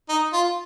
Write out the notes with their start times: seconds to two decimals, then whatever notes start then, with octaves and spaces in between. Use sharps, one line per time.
0.09 D#4
0.33 F4